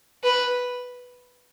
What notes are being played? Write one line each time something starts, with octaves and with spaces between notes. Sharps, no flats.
B4